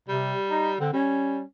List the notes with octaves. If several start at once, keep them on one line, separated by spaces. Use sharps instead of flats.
C3 G3
D#4
D3 C4
G3 C#4